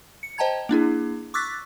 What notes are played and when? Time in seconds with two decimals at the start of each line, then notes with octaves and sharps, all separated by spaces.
0.23 C#7
0.38 C5 D#5 G5 A5 A#5 G#6
0.69 A#3 D4 E4 G#4
1.34 C#6 D6 E6 F#6 A6 B6